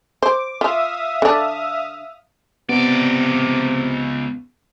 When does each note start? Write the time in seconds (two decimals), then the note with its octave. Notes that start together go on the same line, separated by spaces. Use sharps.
0.22 C5 D6
0.61 F4 E5 F5 D#6
1.22 D3 D4
2.69 C#2 C3 B3 D5